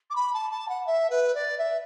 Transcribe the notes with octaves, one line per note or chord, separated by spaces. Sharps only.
D6
B5
A5
A5
F#5
E5
B4
D5
E5